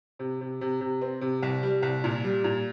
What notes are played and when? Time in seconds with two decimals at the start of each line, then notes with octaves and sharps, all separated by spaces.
0.19 C3
0.41 C3
0.61 C3
0.81 C3
1.01 C4
1.21 C3
1.42 C2
1.63 G3
1.82 C2
2.04 A#2
2.24 G3
2.44 A#2